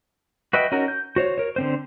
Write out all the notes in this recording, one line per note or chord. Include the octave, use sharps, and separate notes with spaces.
F#4 B4 D#5 E5 G5
C#4 D#4 F#4 A#4
G6
F#4 C5 C#5
A#4 C#5
D3 C4 C5